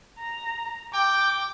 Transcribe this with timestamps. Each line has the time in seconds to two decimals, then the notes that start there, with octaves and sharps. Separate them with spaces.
0.19 A#5
0.94 G5 D6